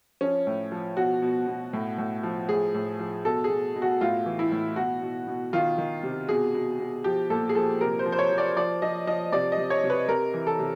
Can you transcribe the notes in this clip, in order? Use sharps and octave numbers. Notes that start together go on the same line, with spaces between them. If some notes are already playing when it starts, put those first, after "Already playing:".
F3 C#4
A2
F3
B2 F#4
B2
B2
A2
A2
F3
A2 G#4
A2
F3
B2 A4
G#4
B2
B2
F#4
A2 F4
E3
E4
A2
B2 F#4
B2
B2
D#3 F4
D#3
C3
B2 G#4
B2
B2
F3 G4
A#2 A4
G#4
F3 A4
C3 A#4
C5
F3
C5
C#5
F3
D5
F3 D5
F3 D#5
F3 D#5
C3 D5
D#5
C3
C#5
C3
B4
C3 A#4
E3
A4
C3